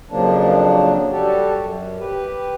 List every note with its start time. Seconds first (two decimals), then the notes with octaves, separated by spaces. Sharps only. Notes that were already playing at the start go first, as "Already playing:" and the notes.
0.10 F2 C#3 F3 F#3 A#3 D4
1.10 G3 F#4 G4 A4
1.55 F#2
1.99 G4 B4